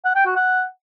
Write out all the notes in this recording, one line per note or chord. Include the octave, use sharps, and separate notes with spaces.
F#5
G5
F#4
F#5